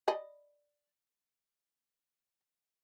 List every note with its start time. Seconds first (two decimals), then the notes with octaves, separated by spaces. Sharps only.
0.08 D5 D#5 B5